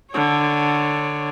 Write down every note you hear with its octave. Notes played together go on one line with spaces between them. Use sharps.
D3 C#5